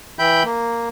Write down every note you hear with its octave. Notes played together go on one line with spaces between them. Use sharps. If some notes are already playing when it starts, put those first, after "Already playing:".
E3 E5 G5 B5 G6
A#3